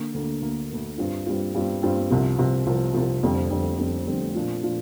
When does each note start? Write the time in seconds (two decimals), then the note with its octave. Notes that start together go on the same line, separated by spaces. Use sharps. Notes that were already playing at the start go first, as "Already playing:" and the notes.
Already playing: D3 A#3
0.14 D2 D3 A#3
0.42 D2 D3 A#3
0.70 D2 D3 A#3
0.98 G2 G3 C4 F4
1.26 G2 G3 C4 F4
1.55 G2 G3 C4 F4
1.82 G2 G3 C4 F4
2.10 C2 C3 F3
2.38 C2 C3 F3
2.67 C2 C3 F3
2.94 C2 C3 F3
3.23 F1 F2 D3 G3 C4
3.50 F1 F2 D3 G3 C4
3.78 F1 F2 D3 G3 C4
4.07 F1 F2 D3 G3 C4
4.35 A#2 F3 D4 F4
4.63 A#2 F3 D4 F4